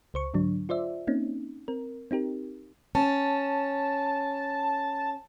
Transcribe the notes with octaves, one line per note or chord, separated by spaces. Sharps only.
C#2 C5 C#6
G#2 D3 F#3 D4
F4 C5 D5 E5
A#3 C4 C#4 D#4
C4 A#4
C4 D#4 G4 A#4
C#4 A5